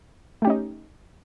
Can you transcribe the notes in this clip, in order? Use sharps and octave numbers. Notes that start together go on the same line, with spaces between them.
A3 C#4 D#4 G4